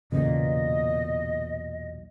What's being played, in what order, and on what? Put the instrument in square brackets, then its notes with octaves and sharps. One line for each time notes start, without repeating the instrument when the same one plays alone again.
[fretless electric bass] B1 E2 A#2 [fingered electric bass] C#3 [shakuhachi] D#5